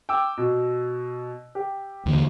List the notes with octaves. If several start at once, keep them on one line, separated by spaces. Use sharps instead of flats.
G5 D6 E6
B2
G4
D#2 D3 E3